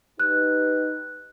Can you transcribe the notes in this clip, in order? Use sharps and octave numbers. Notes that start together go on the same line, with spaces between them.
D#4 G4 B4 F#6